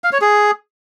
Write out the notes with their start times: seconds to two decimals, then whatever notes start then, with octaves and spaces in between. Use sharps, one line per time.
0.04 F5
0.13 C#5
0.21 G#4